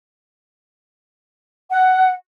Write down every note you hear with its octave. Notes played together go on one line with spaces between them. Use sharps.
F#5